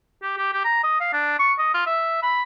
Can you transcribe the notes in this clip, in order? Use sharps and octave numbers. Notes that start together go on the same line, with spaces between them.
G4
G4
G4
A#5
D#5
F5
D4
C#6
D#5
F4
E5
B5